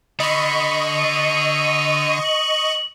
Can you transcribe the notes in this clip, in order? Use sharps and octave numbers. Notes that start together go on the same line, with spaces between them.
D3 D#5 B5 C#6
D#7
F#7